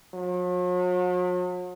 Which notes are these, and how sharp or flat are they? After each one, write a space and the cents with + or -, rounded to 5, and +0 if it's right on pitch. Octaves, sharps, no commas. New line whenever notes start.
F#3 -45